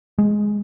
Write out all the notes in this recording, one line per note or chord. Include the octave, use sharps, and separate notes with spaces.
G#3